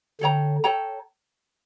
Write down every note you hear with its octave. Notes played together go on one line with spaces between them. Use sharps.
D3 A4 C#5 G5 A#5
A4 C#5 G5 A#5